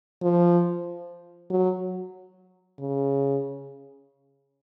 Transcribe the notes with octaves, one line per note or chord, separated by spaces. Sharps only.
F3
F#3
C#3